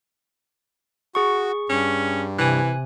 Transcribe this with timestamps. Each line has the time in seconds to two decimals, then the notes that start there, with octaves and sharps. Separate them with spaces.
1.15 F#4 G#4 C#6
1.70 G2 C#4
2.39 C3 E3 G#5 F#6